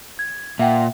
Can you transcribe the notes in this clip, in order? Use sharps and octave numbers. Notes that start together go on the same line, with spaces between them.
G#6
A#2 E5 F#5 G5